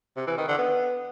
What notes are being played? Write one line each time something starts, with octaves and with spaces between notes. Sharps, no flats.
C3
E3
D#3
D3
B3